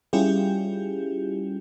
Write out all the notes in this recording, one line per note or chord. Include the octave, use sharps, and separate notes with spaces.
G3 C#4 E4 F4 G4 G#4